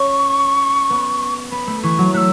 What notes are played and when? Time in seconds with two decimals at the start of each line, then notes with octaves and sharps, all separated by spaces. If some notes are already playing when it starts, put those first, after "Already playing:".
Already playing: C#4 C#6
0.90 B3
1.52 B3 B5
1.67 A3
1.83 E3 C#6
1.98 F#3
2.14 A3 E6 F#6